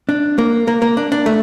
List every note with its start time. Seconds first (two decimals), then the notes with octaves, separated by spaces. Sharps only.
0.09 D4
0.38 A#3
0.67 A#3
0.82 A#3
0.97 D4
1.12 D4
1.26 A3